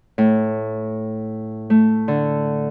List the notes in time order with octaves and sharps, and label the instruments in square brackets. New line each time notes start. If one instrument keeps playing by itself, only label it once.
[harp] A2
A3
D3